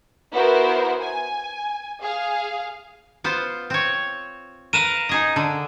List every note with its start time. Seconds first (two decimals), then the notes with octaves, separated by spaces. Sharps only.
0.32 B3 E4 F#4 A#4 C5
1.01 G#5
2.01 G#4 F5
3.24 B3 F4 C5
3.70 C4 C#5
4.73 A#4 B4 F5 D#7 E7
5.09 D#4 G#4 D#5
5.36 D3